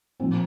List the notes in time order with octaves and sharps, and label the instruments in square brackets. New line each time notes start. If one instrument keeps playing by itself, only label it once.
[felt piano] A#2 F3 C4